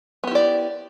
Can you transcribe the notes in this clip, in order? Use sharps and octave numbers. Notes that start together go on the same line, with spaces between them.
B3 E4 G4 D5